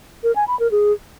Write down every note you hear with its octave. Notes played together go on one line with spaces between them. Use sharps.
A#4
G#5
B5
A#4
G#4